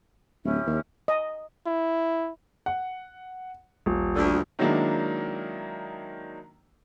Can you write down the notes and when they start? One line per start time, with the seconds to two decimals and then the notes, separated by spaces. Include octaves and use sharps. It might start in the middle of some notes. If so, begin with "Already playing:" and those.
0.44 D1 C#4 E4 G4
0.67 D#2
1.08 D#5
1.66 E4
2.66 F#5
3.86 D#1 A1
4.15 D2 D3
4.59 D#3 F#3 G#3 A#3 D4 E4